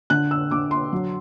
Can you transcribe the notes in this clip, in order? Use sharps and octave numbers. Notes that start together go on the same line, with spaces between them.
D3 F#6
E6
D3 D6
C6
F#3